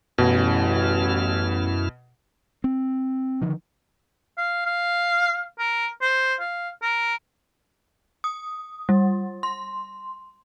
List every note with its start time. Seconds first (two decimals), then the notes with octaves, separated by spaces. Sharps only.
0.18 A1 F#2 B2 E4 F6
2.64 C4
3.41 D3 D#3 F3
4.38 F5
4.66 F5
5.59 A#4
6.02 C5
6.40 F5
6.82 A#4
8.24 D#6
8.89 G3
9.43 C6